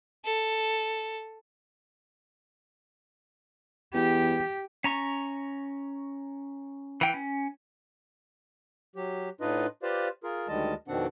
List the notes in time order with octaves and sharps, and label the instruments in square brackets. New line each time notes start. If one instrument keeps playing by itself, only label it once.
[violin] A4
[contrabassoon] E2 [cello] G4
[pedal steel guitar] C#4 A#5 C#6
E3 G5
C#4
[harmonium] F#3 G4
A2 D4 D#4 F4 B4 D#5
F4 G4 B4 C5 D5 F5
F4 G#4 A#4
D2 D#3 G3 G#3 D#5 A5
F2 B2 D#3 C4 D4 F#5